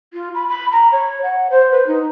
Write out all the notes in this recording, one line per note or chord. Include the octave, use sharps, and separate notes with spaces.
F4
B5
B5
A#5
C#5
F#5
C5
B4
D#4